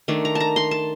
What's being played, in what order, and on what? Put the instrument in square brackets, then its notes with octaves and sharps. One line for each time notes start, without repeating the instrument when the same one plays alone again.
[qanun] D#3 A3 D4
A#5
A5
A#5
C6
A5